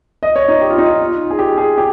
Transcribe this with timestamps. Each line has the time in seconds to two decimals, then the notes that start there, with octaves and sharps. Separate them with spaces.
0.23 D#5
0.36 C#5
0.48 D#4
0.61 G4
0.70 F4
0.78 D#4
0.86 F4
1.31 G#4
1.39 G4
1.58 G#4
1.78 G4